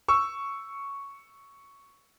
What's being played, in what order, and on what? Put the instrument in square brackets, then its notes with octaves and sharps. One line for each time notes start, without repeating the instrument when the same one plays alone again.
[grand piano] C#6 E6